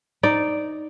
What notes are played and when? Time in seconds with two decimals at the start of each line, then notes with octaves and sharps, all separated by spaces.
0.23 D#4 D5